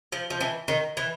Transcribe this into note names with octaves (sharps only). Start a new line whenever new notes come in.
F3
F3
E3
D#3
E3